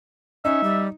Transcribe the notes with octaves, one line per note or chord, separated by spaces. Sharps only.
C#4 D#4 E5
G3